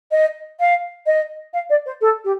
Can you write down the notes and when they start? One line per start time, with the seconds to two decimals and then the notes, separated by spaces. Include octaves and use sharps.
0.11 D#5
0.59 F5
1.06 D#5
1.53 F5
1.69 D5
1.85 C5
2.01 A4
2.24 G4